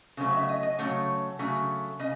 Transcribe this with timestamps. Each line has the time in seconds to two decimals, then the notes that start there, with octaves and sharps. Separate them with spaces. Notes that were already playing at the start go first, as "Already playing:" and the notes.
0.17 C#3 F#3 A3 C5
0.33 E5
0.44 E5
0.49 D#5
0.63 D#5
0.79 C#3 F#3 A3 C#5
1.39 C#3 F#3 A3
1.99 C#3 D#5